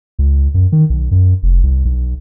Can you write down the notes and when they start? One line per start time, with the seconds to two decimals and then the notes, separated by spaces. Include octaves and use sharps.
0.19 C#2
0.54 F#2
0.72 D#3
0.90 B1
1.11 F#2
1.43 F1
1.63 C2
1.85 B1